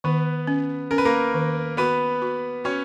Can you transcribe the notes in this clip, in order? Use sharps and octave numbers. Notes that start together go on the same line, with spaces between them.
D#3 B3 B4
C#4
C#4 A#4
B4
A#3 A#4
D#3
B3 F#4 B4
F#4
C#4 F#4 C#5